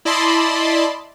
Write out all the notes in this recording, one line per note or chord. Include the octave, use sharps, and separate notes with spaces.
E4 D5 D#5 A5 B5 C6